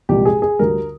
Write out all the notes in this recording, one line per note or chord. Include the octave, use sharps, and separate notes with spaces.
C2 A#2 F3 G#3 G4
G#4
G#4
D2 D3 G3 A#4